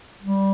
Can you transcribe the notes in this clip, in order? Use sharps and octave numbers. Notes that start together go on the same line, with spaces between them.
G3